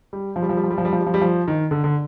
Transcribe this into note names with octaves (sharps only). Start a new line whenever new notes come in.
G3
F3
G3
F3
G3
F3
G3
F3
G3
F3
G3
F3
G3
F3
D#3
D3
D3